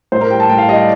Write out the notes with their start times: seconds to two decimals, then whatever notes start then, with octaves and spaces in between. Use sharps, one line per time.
0.12 A2 C5
0.21 A#4
0.30 G3 G5
0.40 A5
0.49 A2 G5
0.58 F5
0.69 G3 D#5
0.77 D5